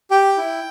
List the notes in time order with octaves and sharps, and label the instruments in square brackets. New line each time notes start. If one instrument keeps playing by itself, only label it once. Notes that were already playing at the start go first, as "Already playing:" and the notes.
[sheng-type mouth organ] G4 G5
E4